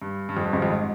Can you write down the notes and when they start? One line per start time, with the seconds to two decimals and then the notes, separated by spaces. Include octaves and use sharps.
0.02 G2
0.29 G2
0.37 F2
0.45 G2
0.53 G#1 G#2
0.62 F2
0.70 G#2